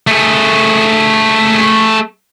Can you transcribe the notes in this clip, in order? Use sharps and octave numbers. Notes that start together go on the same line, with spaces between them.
A3 G#4